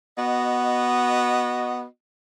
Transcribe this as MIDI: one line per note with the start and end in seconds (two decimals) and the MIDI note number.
0.18 1.85 59
0.18 1.85 66
0.18 1.85 75